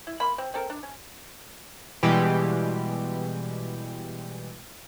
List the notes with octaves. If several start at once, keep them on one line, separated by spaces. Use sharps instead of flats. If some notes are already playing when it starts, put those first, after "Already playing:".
E4
A#3 B5 C6
C4
C4 A4 A#4
D4
C#4
B2 E3 G3 G#3 G4 B4